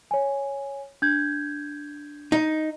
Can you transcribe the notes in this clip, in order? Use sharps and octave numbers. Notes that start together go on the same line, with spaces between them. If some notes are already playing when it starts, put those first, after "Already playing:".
C#5 G#5
D4 G6 G#6
D#4